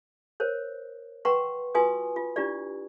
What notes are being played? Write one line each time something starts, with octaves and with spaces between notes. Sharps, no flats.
A#4 C5 C#5
B4 F#5 G5 A#5 C6 C#6
F4 F#4 B4 G#5 C6 D#6
F4
D4 E4 F4 G4 D5